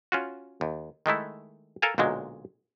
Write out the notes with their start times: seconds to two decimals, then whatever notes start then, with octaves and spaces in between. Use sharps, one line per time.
0.12 C#4 F4 F#4
0.61 D#2
1.06 D#3 G#3 A3 E4
1.82 A4 A#4 F5 G#5 A5
1.98 B1 A#2 D3 F#3 G#3